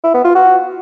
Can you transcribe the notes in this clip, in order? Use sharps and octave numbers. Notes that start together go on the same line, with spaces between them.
E4
B3
F4
F#4